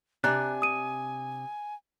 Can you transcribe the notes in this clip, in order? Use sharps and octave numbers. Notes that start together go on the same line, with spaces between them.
C3 D4 D5 G#5 A#5 F#6
D#6 D#7